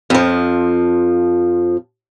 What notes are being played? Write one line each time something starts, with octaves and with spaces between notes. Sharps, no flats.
F2 F3